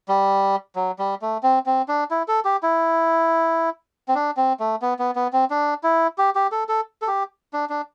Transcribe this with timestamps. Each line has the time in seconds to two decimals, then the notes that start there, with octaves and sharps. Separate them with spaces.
0.08 G3
0.76 F#3
0.99 G3
1.22 A3
1.43 C4
1.66 C4
1.88 D4
2.11 E4
2.28 A4
2.45 G4
2.63 E4
4.08 C4
4.15 D4
4.37 C4
4.60 A3
4.82 B3
4.99 B3
5.16 B3
5.33 C4
5.50 D4
5.84 E4
6.18 G4
6.35 G4
6.52 A4
6.69 A4
7.02 A4
7.08 G4
7.53 D4
7.70 D4